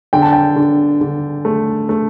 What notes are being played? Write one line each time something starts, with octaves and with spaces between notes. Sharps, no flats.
D3 G5
A5
G5
D3
D3
A3
A3